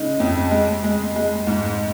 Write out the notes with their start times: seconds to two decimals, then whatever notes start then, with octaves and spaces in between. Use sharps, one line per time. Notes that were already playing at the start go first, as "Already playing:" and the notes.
Already playing: C#3 G#3 D#4
0.20 F2
0.51 G#3
0.83 G#3
1.16 G#3
1.47 G#2